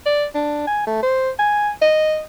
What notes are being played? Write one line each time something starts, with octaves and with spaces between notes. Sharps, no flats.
D5
D4
G#5
A3
C5
G#5
D#5